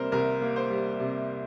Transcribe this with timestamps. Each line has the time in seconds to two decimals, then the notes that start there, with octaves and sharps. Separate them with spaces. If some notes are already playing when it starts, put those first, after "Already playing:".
Already playing: C3 G3 A#3 A#4 C5
0.12 C2 A#4
0.41 A#3
0.56 C5
0.70 G3
1.00 C3